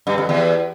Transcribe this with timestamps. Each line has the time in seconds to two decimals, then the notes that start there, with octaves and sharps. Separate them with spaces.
0.07 G2
0.18 F2
0.29 E2